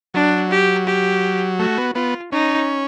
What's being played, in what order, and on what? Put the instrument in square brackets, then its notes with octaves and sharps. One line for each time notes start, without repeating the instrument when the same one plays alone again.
[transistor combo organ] F#3 [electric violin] D4
[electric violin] G4
G4
[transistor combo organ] A3 [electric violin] F#4
[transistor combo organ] B3
[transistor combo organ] B3 [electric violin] F4
[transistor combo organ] C#4 [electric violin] D#4